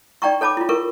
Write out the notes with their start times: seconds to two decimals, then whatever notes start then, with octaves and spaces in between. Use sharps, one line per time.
0.22 D#4 D5 G5 A#5 C#6
0.41 A4 C#5 A5 B5 D6
0.57 E4 F4
0.69 E4 A4 A#4 C#6